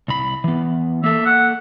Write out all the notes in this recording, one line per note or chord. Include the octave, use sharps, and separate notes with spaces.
C2 B5
E3 B3
A#3 A4 E5
F#5